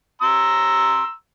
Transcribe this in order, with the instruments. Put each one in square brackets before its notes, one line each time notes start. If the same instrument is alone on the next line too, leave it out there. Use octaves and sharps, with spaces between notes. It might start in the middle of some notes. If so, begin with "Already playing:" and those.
[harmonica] A#5 C6 E6